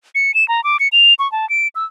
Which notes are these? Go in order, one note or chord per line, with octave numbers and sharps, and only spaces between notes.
C#7
E7
A#5
D6
C#7
F7
C#6
A5
D7
E6